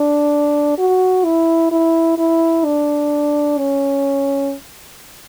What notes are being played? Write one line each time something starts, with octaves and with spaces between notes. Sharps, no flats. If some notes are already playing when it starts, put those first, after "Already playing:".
Already playing: D4
F#4
E4
E4
E4
D4
C#4